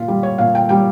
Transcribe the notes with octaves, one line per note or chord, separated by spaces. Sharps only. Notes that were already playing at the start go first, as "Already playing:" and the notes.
Already playing: A#2 F4
G3 G4
C#5
A#2 F5
G5
G3 G5